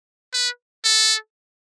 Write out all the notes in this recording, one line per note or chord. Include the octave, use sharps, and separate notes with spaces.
B4
A4